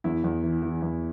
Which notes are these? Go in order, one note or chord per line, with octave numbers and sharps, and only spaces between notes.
E2 E4
E2
E3
E3
E2